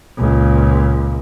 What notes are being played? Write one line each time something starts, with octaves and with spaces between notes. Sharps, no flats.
C#2 A#2